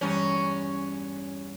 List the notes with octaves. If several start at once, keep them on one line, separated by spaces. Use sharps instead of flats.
E2 G2 C#4 A#5